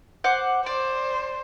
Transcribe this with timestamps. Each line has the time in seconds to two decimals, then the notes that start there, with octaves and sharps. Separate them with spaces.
0.24 C5 F#5 D6
0.66 C5 D5